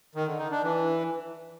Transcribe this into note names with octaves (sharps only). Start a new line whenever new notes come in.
D#3
D3
D#4
D4
E3